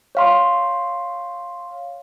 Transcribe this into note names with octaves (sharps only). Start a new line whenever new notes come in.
C#5 F5 C6